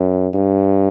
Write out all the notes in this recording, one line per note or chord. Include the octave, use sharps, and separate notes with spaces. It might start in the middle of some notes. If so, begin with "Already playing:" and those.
Already playing: F#2
G2